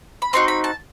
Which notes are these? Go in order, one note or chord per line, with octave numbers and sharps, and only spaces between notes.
B5
C4 D#4 F#4 C6
B5
A5